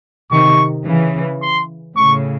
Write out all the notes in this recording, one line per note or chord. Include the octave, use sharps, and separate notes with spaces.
C3 D#3 C#6
C#3 E3
C6
A2 C#3 C#6